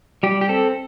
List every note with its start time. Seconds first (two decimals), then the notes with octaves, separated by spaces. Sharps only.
0.23 G3 G4
0.41 G4
0.49 C4 A4